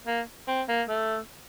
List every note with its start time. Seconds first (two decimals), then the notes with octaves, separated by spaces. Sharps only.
0.07 A#3
0.48 C4
0.68 A#3
0.89 A3